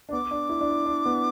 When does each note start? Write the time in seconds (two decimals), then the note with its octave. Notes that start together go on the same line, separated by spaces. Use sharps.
0.09 D4
0.12 B3 D6
0.31 D4
0.49 E4
0.61 D4
0.69 E4
0.86 D4
1.05 B3